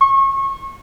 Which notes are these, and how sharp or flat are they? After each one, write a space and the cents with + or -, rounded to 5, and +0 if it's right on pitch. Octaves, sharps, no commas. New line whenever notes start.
C#6 -30